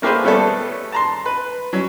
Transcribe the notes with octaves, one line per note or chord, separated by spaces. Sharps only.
A3 A#3 G4 G#4 B4 C5
G3 A3 B3 C#4 A4
A5 A#5 C6
B4
F#3 C#4